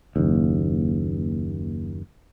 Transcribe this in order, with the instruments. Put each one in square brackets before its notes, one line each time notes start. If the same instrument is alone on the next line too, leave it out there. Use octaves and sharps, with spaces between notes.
[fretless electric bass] F#1 D#2